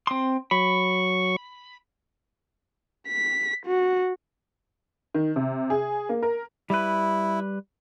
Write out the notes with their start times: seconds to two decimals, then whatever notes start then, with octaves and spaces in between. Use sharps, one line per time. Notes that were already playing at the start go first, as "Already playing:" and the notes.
0.07 C4 C6
0.51 F#3 B5 C#6
3.08 B6
3.66 F#4
5.14 D#3
5.36 C3
5.70 G#4
6.09 A#3
6.22 A#4
6.70 G3 E4 B4